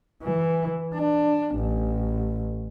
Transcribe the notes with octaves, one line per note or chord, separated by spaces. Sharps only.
E3
D4
A1